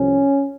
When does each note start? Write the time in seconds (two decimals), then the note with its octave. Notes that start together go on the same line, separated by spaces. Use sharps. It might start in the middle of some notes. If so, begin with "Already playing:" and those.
Already playing: C2 C3 F3 C#4